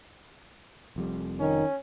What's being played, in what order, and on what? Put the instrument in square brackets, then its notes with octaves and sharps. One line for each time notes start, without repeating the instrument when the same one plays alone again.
[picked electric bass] F1 F2 G3
[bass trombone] D#3 [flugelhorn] C#4